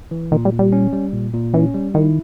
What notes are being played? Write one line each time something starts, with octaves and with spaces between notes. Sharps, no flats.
E3
A#2 D#3
G3
A#2
G3
C#4
G3
A#2
A#2
E3 C#4
G3
D#3 E4